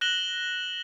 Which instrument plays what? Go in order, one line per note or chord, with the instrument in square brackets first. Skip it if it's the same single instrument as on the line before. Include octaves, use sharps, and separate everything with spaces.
[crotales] F#6 A#6 E7 F#7 G7